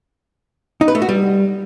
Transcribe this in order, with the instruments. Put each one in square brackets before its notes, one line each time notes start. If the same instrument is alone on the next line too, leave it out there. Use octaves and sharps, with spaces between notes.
[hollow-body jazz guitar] D#4
B4
A3
F#4
G3